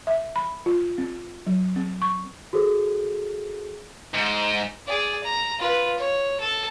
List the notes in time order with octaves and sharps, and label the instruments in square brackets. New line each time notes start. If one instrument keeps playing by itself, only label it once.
[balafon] E5
B5
F4
C4
F#3
C4
C#6
[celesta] F#4 G#4 A4 C5
[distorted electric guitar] G#2
[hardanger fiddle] G#4 D5
A#5
F4 B4
C#5
A4